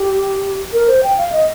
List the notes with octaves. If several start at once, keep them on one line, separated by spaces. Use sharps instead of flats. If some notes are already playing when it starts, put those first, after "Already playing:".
Already playing: G4
A#4
C5
G5
F5
D#5